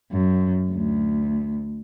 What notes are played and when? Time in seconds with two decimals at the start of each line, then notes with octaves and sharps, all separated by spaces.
0.12 F#2
0.72 D2